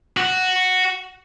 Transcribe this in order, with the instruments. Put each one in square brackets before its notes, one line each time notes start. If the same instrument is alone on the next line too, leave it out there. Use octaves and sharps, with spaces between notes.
[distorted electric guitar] F#4 F#5